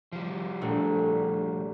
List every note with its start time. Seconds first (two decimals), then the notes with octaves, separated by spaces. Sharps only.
0.12 F3 G3
0.61 A#1 A3